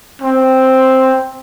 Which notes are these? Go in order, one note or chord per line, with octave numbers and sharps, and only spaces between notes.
C4